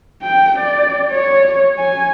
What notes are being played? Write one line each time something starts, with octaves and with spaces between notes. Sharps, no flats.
G5
D5
C#5
G#5